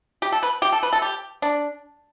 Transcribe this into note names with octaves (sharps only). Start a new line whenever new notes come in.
G4
A4
B4
G4
A4
B4
A4
G4
D4